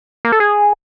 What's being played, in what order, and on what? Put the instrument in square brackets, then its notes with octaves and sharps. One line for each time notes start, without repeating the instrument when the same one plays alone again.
[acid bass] A#3
A4
G#4